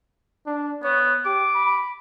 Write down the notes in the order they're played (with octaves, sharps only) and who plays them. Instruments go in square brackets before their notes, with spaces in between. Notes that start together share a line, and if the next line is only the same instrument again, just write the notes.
[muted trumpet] D4
[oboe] B3 [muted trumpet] C#5
[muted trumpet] G4 [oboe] D6
[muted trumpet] B5